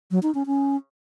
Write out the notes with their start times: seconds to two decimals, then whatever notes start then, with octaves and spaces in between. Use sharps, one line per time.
0.11 F#3
0.23 D#4
0.35 C#4
0.46 C#4